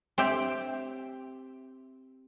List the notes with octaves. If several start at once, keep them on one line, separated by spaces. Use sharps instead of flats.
C4 G4 E5 G5